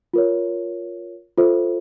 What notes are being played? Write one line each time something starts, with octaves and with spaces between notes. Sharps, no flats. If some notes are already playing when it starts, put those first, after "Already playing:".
F4 A#4 C#5
F4 A4 C5 E5